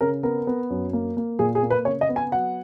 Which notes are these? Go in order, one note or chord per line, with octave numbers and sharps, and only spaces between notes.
C#3 A#4
B3 A#4
B3
F#2
A#3
A#3
A#2 G#4
G#4
A#3
B4
C#3 C#5
D#5
B3
G#5
F#3 F#5